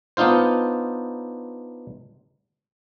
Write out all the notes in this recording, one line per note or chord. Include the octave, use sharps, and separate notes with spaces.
B3 D4 D#4 F4 C5